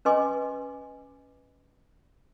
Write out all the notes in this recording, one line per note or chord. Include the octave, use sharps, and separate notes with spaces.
C#4 B4 D#5 G#5 C6 D6